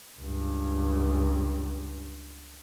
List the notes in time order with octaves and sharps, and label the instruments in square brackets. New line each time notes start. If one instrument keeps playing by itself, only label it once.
[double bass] C#2 G2